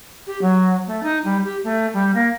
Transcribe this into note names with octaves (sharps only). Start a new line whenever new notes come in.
G4
F#3
A3
D#4
G3
G4
A3
G3
A#3